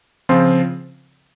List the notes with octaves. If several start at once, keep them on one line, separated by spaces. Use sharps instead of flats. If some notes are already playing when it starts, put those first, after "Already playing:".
C#3 F3 C4 F4